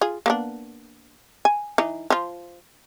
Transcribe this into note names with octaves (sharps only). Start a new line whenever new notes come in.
F4 G#4
A#3 B3 D4
G#5
E3 D#4
F3 F4